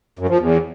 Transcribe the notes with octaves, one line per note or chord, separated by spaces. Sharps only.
F#2
F3
E2